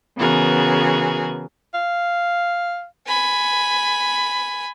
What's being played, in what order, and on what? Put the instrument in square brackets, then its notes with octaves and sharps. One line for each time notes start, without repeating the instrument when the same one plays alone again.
[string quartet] C#3 E3 B3 F#4 G#4 A#4
[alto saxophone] F5
[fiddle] G#5 B5